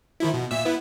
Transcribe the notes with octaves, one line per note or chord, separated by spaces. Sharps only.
D#3 F3 E4
B2
A#2 E5 E6
B3 E4